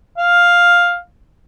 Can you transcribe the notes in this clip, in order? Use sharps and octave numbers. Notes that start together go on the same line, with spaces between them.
F5